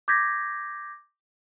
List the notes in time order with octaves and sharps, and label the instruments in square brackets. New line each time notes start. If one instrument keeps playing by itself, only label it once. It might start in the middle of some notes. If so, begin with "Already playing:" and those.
[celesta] D6 G6 G#6 A#6 B6